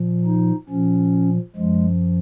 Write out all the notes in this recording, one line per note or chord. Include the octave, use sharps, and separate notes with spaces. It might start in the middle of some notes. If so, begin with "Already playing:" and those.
Already playing: A#2 F3
D#4
A#2 F3 C#4
F#2 F3 G#3